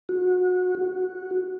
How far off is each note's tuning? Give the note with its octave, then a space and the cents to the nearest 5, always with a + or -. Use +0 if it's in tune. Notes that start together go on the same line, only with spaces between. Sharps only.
F#4 -25
F#4 -10